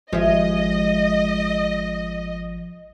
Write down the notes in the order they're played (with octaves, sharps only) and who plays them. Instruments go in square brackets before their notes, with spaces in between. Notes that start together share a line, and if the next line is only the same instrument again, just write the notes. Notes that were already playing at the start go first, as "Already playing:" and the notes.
[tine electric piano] G#1 F3 [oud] G#3 E5 [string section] D#5